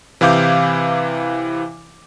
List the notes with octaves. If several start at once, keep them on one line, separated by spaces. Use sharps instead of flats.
C3 E3 E4 F5 D6 G6